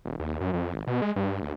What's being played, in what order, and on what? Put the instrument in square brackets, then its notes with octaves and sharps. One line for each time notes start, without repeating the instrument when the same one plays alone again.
[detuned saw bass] D#1
D#2
F#2
F2
G#1
B2
G#3
G2
D2